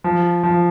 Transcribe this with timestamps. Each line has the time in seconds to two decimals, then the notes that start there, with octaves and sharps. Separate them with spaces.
0.04 F3
0.43 F3